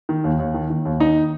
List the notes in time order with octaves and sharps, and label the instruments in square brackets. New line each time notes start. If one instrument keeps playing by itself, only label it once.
[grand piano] D#3
D#2
D#2
D#3
D#3
D#2
D#3 D#4